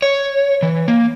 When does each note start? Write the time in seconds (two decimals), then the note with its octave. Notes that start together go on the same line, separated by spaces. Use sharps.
0.02 C#5
0.63 E3
0.88 A#3